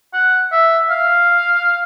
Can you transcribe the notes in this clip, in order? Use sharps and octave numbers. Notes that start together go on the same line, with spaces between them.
F#5
E5
F5